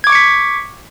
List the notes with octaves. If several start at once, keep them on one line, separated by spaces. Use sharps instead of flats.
C#6 D6 G#6 B6 C#7